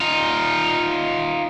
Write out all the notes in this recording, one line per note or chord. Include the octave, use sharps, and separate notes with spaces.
D#4 F4